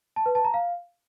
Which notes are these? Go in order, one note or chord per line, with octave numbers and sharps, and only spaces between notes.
A5
B4
A5
A#5
F5